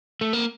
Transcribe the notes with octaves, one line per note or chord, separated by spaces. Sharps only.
A3
A#3